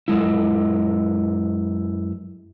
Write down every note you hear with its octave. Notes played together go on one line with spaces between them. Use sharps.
F#2 C#3 G#3 E4